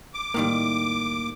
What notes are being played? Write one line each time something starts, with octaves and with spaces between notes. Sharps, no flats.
D6
A2 D#3 G3 A#3